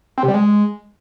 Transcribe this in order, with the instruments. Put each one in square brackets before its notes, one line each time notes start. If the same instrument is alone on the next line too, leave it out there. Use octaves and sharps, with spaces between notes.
[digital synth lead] C4
C3
G3
G#3